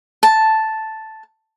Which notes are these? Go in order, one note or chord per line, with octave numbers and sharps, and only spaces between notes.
A5